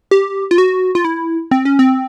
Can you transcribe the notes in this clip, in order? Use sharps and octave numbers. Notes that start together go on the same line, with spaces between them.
G4
F4
F#4
F4
E4
C4
C#4
C4